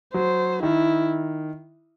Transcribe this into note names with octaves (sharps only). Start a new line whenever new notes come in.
F#3 C5
D#3 E4